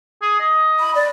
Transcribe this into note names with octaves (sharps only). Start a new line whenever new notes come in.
G#4
D#5
B5
D5